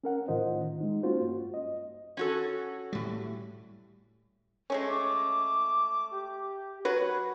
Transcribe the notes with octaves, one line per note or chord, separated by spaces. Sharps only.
C#4 A#4 F#5
C#2 A2 D#3 F4 C5 D#5
G#3 D#4
A#3 C#4 F4 F#4 C5
G2
D#5
C#4 F#4 A4
A2 G3
G#3 A3 C#4
D6
G4
F#3 F#4 B4 C#5